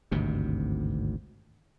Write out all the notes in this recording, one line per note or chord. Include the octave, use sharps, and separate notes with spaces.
G#1 D2 G2 C3